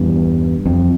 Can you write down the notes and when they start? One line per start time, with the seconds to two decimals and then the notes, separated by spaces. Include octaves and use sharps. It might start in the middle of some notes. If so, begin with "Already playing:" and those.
Already playing: E2 G2
0.66 F2